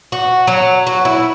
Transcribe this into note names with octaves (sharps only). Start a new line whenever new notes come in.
F#4
F#3
F#4
E4